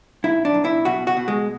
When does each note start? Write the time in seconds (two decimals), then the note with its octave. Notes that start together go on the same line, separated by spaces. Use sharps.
0.24 B1 E4
0.45 D4
0.54 B1
0.65 E4
0.85 B2 F#4
1.07 F#4
1.17 B2
1.28 G#3